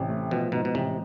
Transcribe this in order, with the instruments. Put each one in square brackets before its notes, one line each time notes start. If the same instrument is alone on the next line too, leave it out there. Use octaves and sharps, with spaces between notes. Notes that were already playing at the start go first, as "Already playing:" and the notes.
Already playing: [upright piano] A1 [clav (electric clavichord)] C3
[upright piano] A3
[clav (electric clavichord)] B2 [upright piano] F3
[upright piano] G#2 [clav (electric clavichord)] B2
[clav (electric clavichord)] B2
[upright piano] A1 [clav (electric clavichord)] C3